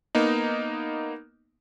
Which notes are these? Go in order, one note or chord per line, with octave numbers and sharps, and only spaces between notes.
A#3 B3 D#4